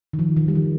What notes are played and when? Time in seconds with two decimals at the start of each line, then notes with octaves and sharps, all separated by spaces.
0.13 D#3
0.19 F3
0.37 D#3
0.48 G3
0.55 F3